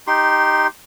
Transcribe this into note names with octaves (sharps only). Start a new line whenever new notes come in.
D#4 G4 C6